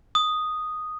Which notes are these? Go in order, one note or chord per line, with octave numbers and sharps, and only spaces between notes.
D#6